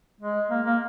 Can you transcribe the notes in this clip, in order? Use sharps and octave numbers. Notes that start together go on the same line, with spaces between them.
G#3
A#3
A#3